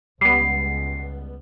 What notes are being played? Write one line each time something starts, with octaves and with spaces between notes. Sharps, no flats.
C#2 G3 B3 C7